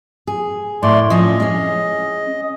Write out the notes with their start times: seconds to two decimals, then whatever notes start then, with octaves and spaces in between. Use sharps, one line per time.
0.27 G#4
0.83 A2 A3 D5 C6
1.10 F3 C#4 D#5
1.40 G#3 C#4